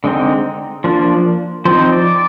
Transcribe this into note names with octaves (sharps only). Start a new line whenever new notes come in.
D3 G#3 C4 D#4
F3 A#3 D4
F3 C4 D#4 C5
D5